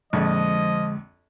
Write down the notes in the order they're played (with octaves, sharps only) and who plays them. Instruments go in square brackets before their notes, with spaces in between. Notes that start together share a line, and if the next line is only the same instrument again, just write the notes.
[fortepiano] A#1 F2 [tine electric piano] D3 G#3 [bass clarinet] F3 [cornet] D#5